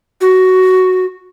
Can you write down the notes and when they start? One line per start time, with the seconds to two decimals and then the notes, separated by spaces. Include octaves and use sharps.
0.21 F#4